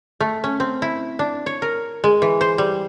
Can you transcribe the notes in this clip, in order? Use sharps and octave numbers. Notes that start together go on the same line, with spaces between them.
A3
C#4
C4
E4
D4
C#5
A#4
G#3
E3
C5
G3